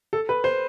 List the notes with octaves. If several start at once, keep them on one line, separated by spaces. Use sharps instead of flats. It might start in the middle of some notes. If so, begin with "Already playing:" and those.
A4
B4
C5